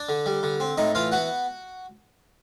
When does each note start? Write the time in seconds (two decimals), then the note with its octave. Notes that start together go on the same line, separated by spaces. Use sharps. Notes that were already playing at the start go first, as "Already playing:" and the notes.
Already playing: D4 D5
0.09 D3
0.26 G3
0.43 D3
0.60 C4
0.78 A2 D#4 D#5
0.95 E3 F4 F5
1.12 B3 F#4 F#5